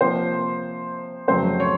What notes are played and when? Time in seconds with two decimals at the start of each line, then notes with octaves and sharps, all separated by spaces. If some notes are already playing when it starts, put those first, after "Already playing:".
0.01 C3 F3 A#3 C5
1.28 F2 C#3 F#3 A3 C4 C5
1.60 C#5